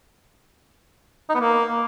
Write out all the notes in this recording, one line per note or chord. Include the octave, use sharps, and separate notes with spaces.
D#4
B3
A#3